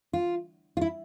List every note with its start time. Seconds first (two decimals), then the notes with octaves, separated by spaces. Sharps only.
0.13 F4
0.77 F4
0.81 E4